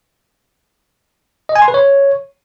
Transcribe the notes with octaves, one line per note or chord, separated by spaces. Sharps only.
D#5
G#5
C6
B4
C#5